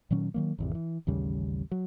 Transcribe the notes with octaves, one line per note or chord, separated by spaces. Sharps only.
A#2 D#3 F#3 C#4
D#3 F#3 A#3
G#1 E2 C3
E3
A1 D#2 C#3 G3
F#3